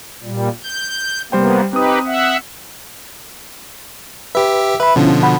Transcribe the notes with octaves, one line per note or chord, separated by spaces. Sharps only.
A#2 G3
G6
C3 G3 A#3 B3 C5 G5
C4 D#4 G4 B4 D#6
E5 F#5
G4 B4 E5
B4 E5 B5
B2 D3 F3 C#4 E4 F4
F#5 B5